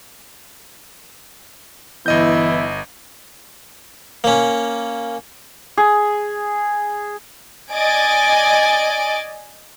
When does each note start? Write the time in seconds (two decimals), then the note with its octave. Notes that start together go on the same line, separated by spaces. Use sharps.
2.06 G1 E3 B3 E4 D#5 G6
4.24 A#3 C#4
5.77 G#4
7.73 D5 D#5 G#5 A6 D7